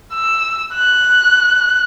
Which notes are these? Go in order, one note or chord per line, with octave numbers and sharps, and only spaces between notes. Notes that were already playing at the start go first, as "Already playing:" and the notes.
E6
F#6